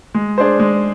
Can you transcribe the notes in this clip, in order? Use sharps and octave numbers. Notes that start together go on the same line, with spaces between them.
G#3
D4 G#4 C5
G#3